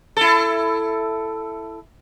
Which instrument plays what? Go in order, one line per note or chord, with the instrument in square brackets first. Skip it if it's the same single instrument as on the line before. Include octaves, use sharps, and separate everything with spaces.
[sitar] E4 A4